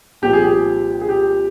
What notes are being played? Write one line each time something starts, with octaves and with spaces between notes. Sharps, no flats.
C2 A#2 F3 G4
G#4
G4
G#4
G4